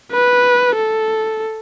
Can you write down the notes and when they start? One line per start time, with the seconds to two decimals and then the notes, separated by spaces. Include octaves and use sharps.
0.11 B4
0.76 A4